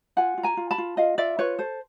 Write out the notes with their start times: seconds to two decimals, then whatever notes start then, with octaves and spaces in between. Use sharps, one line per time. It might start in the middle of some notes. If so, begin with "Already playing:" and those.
0.17 F4 F#5 G#5
0.38 F4
0.43 G#5 A#5
0.57 F4
0.71 A5 B5
0.78 F4
0.97 F4 D#5 F5
1.18 F4 D5 E5
1.39 F4 B4 C#5
1.59 A4 C5